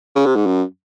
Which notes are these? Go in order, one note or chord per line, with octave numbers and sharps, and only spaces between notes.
C#3
C3
G#2
F#2